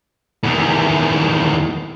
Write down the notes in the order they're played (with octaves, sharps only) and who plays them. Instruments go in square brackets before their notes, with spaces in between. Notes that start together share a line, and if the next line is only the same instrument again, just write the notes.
[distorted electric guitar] E2 D#3